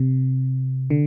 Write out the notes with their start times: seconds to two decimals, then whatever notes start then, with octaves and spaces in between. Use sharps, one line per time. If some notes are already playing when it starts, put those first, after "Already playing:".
Already playing: C3
0.90 D3